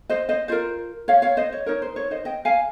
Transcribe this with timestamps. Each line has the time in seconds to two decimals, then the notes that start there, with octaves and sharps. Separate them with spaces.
0.10 C5 D#5
0.29 C5 D#5
0.48 F4 A#4 C5
1.08 C#5 F5
1.22 C#5 F5
1.37 C5 D#5
1.53 C#5
1.66 D#4 A#4 C#5
1.82 C5
1.96 C#5
2.11 C5 D#5
2.25 D#5 G5
2.45 F5 G#5